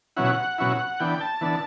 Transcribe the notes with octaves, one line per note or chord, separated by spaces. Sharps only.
B2 F#3 C#4 E4 F#5
B2 F#3 C#4 E4
E3 B3 D4 G5
A5
E3 B3 D4